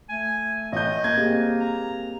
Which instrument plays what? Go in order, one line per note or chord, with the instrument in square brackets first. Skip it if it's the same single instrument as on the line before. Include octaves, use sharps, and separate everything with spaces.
[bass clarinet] A3 [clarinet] G#5
[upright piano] A1 G6 [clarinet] D#5
[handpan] A#3 [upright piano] G#6
[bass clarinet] A#3 [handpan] C4 G4 G#4
[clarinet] A#5